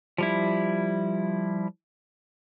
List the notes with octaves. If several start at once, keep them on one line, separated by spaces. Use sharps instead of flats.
F3 G3 E4